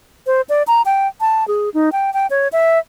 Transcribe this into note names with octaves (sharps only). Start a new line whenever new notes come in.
C5
D5
A#5
G5
A5
G#4
D#4
G5
G5
C#5
E5